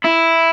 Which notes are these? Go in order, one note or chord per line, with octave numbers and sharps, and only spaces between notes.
E4